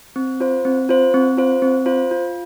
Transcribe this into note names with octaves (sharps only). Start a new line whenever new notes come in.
C4
F4 C5
C4
F4 C5
C4
F4 C5
C4
F4 C5
F4